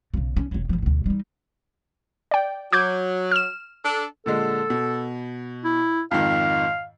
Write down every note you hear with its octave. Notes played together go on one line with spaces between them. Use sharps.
B1 C#3
C#4
E1 F#3
G#1 F3
D2 B2
G3 D#4
D5 G5
F#3 D6 G6 G#6
F6 E7
D4 A4
A#2 D3 G#3 A4
B2
E4
F2 G#2 D#3 F5